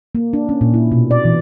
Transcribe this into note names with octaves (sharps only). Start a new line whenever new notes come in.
A#3
D4
C#4
A#2
E4
B2
D5
E3